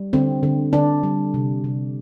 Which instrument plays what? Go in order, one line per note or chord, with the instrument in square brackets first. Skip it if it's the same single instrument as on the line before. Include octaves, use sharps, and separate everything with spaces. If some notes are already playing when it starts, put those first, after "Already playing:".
Already playing: [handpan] G3
D3 C4
D3
D3 D4
G3
C3
C3